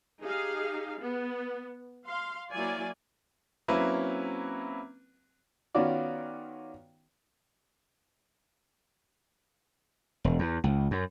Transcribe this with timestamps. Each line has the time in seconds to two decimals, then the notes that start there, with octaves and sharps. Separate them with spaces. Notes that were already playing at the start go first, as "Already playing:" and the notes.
0.22 D#4 G4 G#4 F5
1.00 B3
2.07 F5 C6
2.52 F#3 A#3 E4 D5 G#5
3.68 F#3 A#3 C4 C#4 E4 B4
5.75 D#3 B3 C#4 F4 F#4 D5
10.24 E1
10.39 E2
10.64 C#2
10.91 F#2